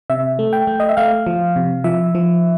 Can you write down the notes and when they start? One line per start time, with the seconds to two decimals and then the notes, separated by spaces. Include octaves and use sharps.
0.10 C3 E5
0.39 A3
0.53 G5
0.67 A3
0.80 D#5
0.89 E5
0.97 A3 F5
1.27 F3
1.56 C3
1.84 F3 E5
2.15 F3